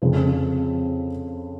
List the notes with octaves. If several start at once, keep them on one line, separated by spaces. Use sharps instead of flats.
F2 C#3 F3 C4